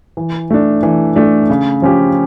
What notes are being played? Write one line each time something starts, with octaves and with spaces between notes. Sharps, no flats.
E3
A3 D4
E3
A3 D4
C#3
F3 C#4 G4